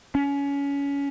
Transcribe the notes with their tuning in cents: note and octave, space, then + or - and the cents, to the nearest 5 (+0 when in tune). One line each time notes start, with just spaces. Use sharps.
C#4 +25